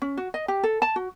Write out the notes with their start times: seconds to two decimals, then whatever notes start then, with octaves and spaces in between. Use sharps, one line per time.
0.02 C#4
0.17 F#4
0.34 D#5
0.48 G4
0.64 A4
0.82 A5
0.96 F#4